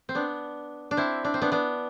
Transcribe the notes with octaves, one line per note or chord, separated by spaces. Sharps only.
C4
B3 D4
D4
C4 E4
D4
C4
B3 D4
B3 D4